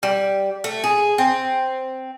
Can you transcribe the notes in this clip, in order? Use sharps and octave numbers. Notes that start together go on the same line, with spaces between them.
G3
A3
G#4
C4